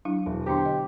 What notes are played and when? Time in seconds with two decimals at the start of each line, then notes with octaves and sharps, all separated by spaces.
0.05 F#3 D4 E4
0.26 E1 B2
0.46 D3 B3 D4 G4 C6
0.66 D#5